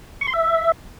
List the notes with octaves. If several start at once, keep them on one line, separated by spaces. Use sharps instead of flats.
C#6
C6
E5